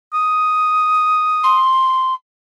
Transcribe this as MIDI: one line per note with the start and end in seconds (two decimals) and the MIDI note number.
0.13 1.62 87
1.43 2.13 84